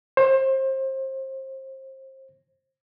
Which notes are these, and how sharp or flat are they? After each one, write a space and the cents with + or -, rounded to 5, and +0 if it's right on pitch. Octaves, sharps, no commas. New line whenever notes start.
C5 +30